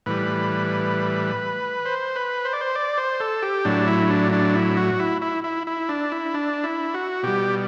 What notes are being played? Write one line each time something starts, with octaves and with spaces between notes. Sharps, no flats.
A2 E3 G3 B4
C5
B4
C5
D5
C5
D5
C5
A4
G4
A2 F#3 D4
E4
D4
D4
E4
F#4
E4
E4
E4
E4
D4
E4
D4
E4
F#4
B2 G3 G4